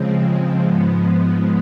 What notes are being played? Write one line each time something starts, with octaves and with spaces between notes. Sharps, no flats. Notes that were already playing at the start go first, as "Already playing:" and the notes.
Already playing: C#3 F3 G#3 C4
G#2 F3 G#3 B3